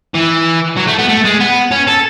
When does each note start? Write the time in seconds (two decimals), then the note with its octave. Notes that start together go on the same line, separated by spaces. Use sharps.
0.14 E3
0.77 F#3
0.87 A3
0.99 B3
1.09 A3
1.24 G#3
1.40 B3
1.71 C#4
1.87 A4